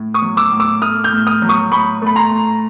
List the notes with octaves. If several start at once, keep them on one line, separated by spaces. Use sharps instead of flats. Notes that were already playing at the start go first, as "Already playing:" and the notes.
Already playing: A2
C#6 D#6
F#3
D6 E6
A2
D6 E6
A3 D#6 F6
F6 G6
A2
D#6 F6
F#3
C#6 D#6
A2 B5 C#6
A3
B5
A#5 C6
A2